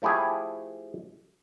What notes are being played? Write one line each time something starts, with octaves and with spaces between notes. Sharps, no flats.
F3 A3 E4 G4 G#4